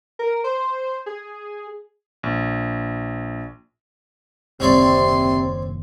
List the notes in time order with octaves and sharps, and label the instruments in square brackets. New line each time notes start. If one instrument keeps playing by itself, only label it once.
[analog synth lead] A#4
C5
G#4
[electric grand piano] A#1
[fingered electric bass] F#1 D#2 [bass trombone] C3 [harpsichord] C4 C#5 D5 [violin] C6